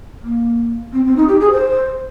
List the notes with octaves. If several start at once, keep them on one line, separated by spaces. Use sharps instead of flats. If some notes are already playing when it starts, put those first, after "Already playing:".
A#3
C4
C4
D#4
G4
G#4
C5